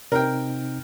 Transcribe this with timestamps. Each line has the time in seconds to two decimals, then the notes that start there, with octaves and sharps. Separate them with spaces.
0.12 C3 C4 D#4 A#4 G5